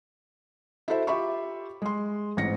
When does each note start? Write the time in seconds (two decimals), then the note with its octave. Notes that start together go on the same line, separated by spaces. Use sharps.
0.88 E4 F#4 A4 C5 E5
1.07 F4 G4 E5 B5 C#6
1.82 G#3 C6
2.37 A1 G#2 C4 A#6 C#7